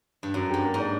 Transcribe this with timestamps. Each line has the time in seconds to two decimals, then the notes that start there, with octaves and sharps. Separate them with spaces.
0.23 G2
0.34 F#2 F#3
0.49 G2 G4
0.64 A#3
0.74 G#2
0.79 D4